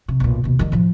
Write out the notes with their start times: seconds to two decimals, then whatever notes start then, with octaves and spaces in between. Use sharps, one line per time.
0.08 C3
0.20 B1 A#2
0.44 D#2 B2
0.59 D#3 G3
0.72 A2 F3